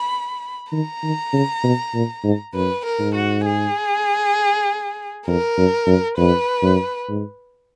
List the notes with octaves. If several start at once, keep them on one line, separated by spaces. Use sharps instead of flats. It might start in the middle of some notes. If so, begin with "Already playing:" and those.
Already playing: B5
D#3 A#5
D#3
C#3
B2
A#2
G#2
F#2 B4
A#4
G#2
F#4
G#4
F2 A#4
F#2
F#2
F2 B4
F#2
G#2